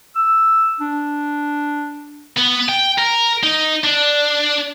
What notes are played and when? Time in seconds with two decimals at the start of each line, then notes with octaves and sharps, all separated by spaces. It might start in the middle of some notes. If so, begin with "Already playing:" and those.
0.16 E6
0.80 D4
2.37 B3
2.69 G5
2.99 A#4
3.43 D#4
3.84 D4